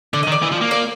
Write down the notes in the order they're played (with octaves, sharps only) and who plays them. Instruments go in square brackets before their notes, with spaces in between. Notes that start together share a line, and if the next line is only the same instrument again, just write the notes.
[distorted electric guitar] D3 [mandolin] D5
[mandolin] D#5
[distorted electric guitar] D#3
[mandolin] D5
[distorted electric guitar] E3
F3
A#3
[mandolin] D5